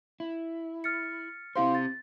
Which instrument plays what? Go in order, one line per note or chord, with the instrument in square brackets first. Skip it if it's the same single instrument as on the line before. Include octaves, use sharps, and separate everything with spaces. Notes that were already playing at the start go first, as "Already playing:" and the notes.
[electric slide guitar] E4
[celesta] F6 A6 C#7
[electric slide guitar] C4 G4 C5 [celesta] E4 F5 C6
[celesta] A6